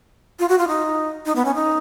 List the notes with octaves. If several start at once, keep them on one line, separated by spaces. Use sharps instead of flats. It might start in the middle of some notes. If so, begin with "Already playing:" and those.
F4
F#4
F4
D#4
D#4
B3
C#4
D#4